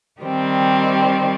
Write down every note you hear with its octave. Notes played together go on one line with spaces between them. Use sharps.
D#3 G3 C4